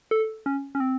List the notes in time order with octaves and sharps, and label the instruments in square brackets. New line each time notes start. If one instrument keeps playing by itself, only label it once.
[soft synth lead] A4
C#4
C#4
C4